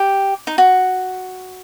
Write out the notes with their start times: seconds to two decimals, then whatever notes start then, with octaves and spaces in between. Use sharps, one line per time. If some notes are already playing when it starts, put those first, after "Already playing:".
Already playing: G4
0.47 D#4
0.58 F#4